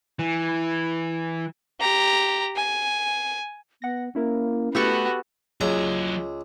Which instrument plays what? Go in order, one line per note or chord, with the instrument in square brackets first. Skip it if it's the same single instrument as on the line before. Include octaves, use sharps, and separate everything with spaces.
[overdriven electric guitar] E3
[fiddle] G4 A#5
G#5
[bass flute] B3 [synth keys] F#5 A#6
[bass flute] A#3 [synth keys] C#4 E4 A#4
[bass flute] A3 [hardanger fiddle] B3 F#4 [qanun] G4 A4 C#6
[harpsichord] C#2 A#5 [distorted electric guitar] F#3 G#4